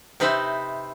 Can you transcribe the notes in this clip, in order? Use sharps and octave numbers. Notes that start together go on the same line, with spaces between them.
C3 D#4 B4 C5 E5